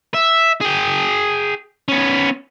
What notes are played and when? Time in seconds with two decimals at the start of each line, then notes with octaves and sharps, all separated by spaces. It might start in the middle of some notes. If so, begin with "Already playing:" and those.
0.14 E5
0.61 G#4 G5
1.88 B3 C#4